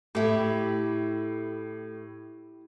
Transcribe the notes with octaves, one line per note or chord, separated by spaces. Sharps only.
A2 E4 G4